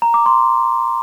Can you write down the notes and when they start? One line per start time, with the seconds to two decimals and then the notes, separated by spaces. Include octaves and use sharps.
0.02 A#5
0.14 D6
0.26 C6